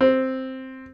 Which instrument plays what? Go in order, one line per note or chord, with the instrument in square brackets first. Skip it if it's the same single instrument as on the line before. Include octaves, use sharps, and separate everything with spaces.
[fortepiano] C4